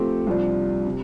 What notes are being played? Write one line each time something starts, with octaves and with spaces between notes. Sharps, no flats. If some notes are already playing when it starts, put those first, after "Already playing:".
Already playing: F3 A3 C4 G4 C5
C2 C3 F3 D4
C3